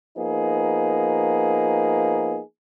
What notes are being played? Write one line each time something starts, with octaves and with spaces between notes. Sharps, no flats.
F3 A#3 B3 D#4 G#4